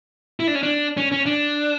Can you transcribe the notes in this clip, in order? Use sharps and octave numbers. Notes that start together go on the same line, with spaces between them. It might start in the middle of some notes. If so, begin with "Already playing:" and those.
E4
D4
C#4
D4
C#4
C#4
D4